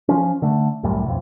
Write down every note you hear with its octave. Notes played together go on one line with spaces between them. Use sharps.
F3 C#4
D3 A3
C2 F#2 A2 G3
B1 F2